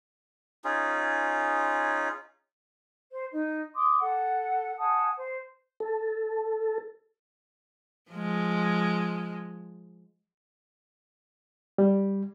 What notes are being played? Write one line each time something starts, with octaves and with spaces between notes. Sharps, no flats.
C#4 D#4 F4 G#4
C5
D#4
C6 D6 D#6
A4 F#5
F#5 G#5 A5 D#6
C5
A4
F3 G#3
G3